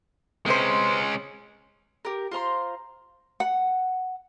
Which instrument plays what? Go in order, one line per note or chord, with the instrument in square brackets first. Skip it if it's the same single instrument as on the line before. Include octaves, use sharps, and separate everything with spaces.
[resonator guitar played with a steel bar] C3 B4 C5 [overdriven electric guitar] G#3 C#4
[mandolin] G4 A#4
F4 C5 A#5 C6
[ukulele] F#5